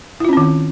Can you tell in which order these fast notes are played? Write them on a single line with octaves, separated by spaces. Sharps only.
E4 F4 C#4 C4 D#3